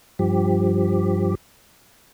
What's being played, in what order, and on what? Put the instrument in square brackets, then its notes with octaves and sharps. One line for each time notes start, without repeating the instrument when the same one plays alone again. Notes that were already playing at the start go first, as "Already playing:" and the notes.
[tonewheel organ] G2 F3 G4